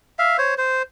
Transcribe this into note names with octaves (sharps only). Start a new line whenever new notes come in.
E5 F5
C5 C#5
C5